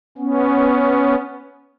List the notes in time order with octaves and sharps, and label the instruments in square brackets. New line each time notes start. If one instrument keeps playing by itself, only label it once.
[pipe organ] B3 C#4